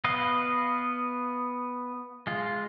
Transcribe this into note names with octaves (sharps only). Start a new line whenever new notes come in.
B3 B4 D#5 F5
G#3 F4